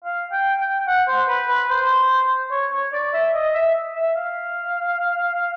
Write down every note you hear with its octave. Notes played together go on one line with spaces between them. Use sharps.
F5
G5
G5
F#5
C5
B4
B4
C5
C#5
C#5
D5
E5
D#5
E5
E5
F5